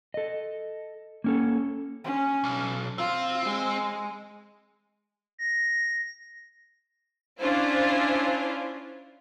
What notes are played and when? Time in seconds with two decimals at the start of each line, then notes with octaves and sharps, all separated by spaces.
0.14 A4 D#5
1.24 A#3 C#4 A4
2.05 C#4
2.44 B1
2.98 C4 F4
3.46 G#3
5.39 A#6
7.39 C#4 D4 E4 F4 C5